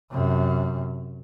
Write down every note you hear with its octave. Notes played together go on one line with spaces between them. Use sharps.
F#2 C3